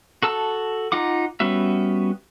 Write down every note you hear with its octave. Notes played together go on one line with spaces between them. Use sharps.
F#4 A4 A5 E6
D#4 F4 F#5 D6
G3 B3 C#4 F#4 E5